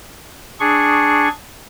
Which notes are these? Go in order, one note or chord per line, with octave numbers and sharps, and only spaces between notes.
D4 G#4 C#6